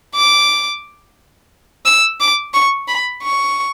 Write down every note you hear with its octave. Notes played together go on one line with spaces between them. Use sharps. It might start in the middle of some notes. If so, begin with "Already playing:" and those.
D6
E6
D6
C#6
B5
C#6